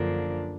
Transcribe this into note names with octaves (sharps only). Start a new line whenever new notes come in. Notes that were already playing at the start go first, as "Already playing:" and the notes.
Already playing: F#2 D3 F3 A#3 D4